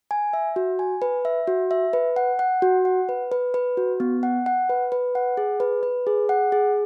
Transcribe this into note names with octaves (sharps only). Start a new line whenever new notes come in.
G#5
E5
F#4
G#5
B4
E5
F#4
E5
B4
F#5
F#5
F#4
F#5
B4
B4
B4
F#4
B3
F#5
F#5
B4
B4
F#5
G#4
B4
B4
G#4
F#5
G#4